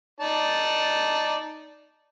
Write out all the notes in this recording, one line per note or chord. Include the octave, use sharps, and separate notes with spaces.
D#4 D5 A5